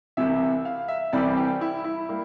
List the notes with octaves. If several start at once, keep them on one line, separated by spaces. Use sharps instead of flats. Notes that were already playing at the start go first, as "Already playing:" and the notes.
C2 C3 E3 E5
F5
E5
C2 C3 E3 G3 C4 D5
G4
E4
E4
G3 A#3